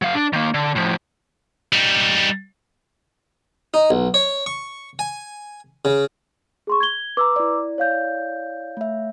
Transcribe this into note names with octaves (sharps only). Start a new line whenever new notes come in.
F#3 F5
D4
D#3 A#3
D3
A2 F3
G3 D#4
D#4
B1
C#5
C#6
G#5
C#3
G#4 C6 C#6
G#6 G7
B4 A#5 D6 E6
E4 D5
C#5 F5 G6
A3 E5